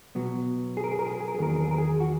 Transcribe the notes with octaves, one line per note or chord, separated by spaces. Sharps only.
B2 F#3 B3
G#4
A#4
G#4
A#4
G#4
A#4
G#4
A#4
G#4
E2 D#3 F#3 A#3 A#4
G#4
A#4
G#4
A#4
G#4
F#4